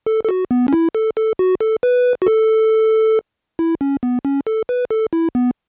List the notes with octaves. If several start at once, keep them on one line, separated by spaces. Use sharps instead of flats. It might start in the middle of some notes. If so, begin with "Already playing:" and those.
A4
A4
F#4
B3
C#4
E4
A4
A4
F#4
A4
B4
F#4
A4
E4
C#4
B3
C#4
A4
B4
A4
E4
B3